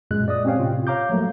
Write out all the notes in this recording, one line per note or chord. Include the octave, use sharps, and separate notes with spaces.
F#2 A#2 G#3 F#6
D5 D#5 D#6
C4 C#4 G4 C#5 F5 G5
A2 C3 F4
C#5 F5 A#5 D6 G6
F3 F#3 A3 A#3